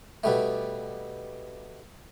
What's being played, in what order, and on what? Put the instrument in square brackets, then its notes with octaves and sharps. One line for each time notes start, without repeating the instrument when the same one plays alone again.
[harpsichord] B2 G3 A3